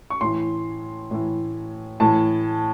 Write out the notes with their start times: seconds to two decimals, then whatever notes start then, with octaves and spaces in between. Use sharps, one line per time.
0.10 C#6
0.21 A2 E3 C6
1.11 A2 E3
2.00 A2 E3 A5